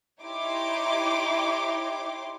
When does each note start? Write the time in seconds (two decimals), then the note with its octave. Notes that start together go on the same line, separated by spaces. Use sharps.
0.21 D#4 E4 G4 C#5 C6 D6